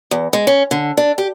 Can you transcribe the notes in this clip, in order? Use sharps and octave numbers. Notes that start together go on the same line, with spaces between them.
E2
G#3
C#4
D3
D4
G4